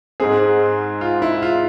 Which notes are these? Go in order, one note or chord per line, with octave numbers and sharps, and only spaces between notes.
G#2 G#3 C4 G#4
F4
E4
F4